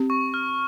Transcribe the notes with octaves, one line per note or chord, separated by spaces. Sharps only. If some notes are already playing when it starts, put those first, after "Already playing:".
Already playing: C4 G4
C#6
F6